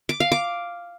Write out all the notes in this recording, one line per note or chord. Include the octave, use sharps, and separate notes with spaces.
D6
F5
D6